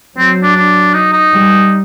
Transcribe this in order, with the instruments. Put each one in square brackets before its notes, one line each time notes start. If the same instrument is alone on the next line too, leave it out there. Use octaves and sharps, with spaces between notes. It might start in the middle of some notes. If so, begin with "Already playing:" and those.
[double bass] F#3 [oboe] C4
[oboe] D4
D4
D#4
D#4
[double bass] G3